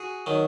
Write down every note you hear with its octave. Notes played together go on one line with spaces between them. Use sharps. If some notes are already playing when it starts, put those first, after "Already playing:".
Already playing: F#4 G#4
D#3 F#3